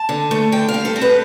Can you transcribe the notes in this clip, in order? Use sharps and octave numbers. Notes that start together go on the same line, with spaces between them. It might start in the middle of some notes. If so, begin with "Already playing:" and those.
Already playing: A5
D3
A3
D3 G5
F5
G3
A4
C4
B4